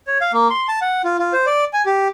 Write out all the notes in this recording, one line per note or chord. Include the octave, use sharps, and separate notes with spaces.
C#5
F5
A#3
C6
A5
F#5
F4
F4
C5
D5
G#5
G4